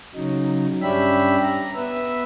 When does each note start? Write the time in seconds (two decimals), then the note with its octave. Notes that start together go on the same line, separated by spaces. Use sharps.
0.15 C#3 F#3 D#4
0.82 G2 C#4 D4 G4 E5 B5
1.42 A#5
1.75 B3 B4 E5